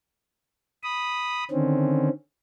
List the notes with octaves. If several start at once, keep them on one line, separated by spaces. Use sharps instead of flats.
B5 D#6
D3 D#3 C4 C#4